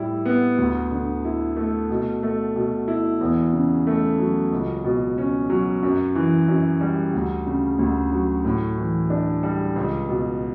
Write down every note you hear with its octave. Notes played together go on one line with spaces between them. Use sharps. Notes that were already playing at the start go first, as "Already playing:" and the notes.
Already playing: A2 G3 E4
B3
D2
D3
E4
A3
B2
A3
B2
E4
E2
C#3
A3
F#3
C#2
B2
C#4
F#3
F#2
E3
F#2
G3
D2
C#3
D2
F#3
A2
E3
D4
G3
C#2
B2